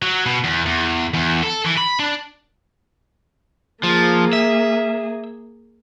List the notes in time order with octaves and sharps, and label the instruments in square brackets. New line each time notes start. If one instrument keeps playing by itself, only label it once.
[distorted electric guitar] F#3
B2
E2
E2
E2
A4
E3
B5
D4
[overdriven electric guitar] F3 [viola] A#3 G#4
[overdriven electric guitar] E5